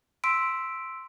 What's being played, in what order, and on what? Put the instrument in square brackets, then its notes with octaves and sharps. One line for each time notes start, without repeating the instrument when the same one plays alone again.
[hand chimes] C6 E6 B6 D7